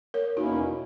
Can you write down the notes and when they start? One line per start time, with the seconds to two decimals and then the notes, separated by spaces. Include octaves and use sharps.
0.14 A#4 C#5
0.36 E2 B2 A#3 C#4 D#4 E4 F#4